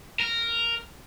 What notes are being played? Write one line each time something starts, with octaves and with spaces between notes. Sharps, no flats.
A#4